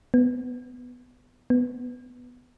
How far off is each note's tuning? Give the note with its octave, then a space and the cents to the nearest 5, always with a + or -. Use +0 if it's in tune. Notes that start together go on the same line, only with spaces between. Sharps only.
B3 +5
B3 +5